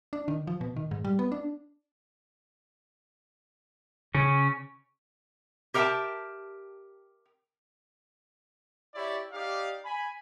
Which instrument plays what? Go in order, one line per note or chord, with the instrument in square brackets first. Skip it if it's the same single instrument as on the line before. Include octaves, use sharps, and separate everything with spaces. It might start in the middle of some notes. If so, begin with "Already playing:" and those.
[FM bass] D4
D#3
F3
B2
D#3
G#2
G3
B3
D4
[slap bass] C#3 [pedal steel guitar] C#4
[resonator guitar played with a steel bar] G4 A#4 E5 F#5 G5 A5
[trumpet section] E4 G4 C#5 D5
D#4 G4 D5 F5
G#5 B5